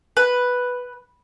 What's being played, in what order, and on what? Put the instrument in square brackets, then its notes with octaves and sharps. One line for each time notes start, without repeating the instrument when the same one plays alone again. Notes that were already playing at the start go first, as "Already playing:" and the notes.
[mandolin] B4